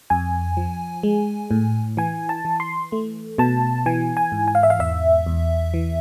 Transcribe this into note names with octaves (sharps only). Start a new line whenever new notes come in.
F2 G#5
F3
G#3
A2
E3 G#5
A5
E3
C6
A3
B2 A5
E3 G#5
G#5
G#2
G#5
F5
E5
F5
E2 E5
E2
E3